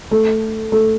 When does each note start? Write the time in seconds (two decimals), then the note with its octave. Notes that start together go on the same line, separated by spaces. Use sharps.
0.11 A3
0.72 A3